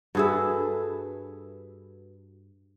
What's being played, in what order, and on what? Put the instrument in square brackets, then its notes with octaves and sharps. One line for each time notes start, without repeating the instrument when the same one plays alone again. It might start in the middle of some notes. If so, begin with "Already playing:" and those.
[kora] G2 G#4 E5 [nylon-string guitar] F#4 A4 B4